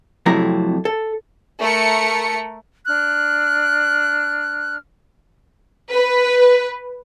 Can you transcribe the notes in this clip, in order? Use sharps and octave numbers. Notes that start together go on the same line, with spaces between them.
F2 C3 F#3 A3 E4 A#5
A4
A3 A#4 C#7
D4 F6 F#6
B4